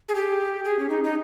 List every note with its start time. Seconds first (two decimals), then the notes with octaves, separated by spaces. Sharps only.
0.09 G#4
0.15 G4
0.65 G#4
0.79 C#4
0.89 D#4
1.04 D#4